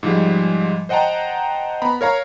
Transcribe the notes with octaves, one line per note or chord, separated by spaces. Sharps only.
G#2 F3 G3 G#3
C5 D#5 F#5 G5 A5 A#5
B3 A#5 B5
A#4 C#5 F5 A#5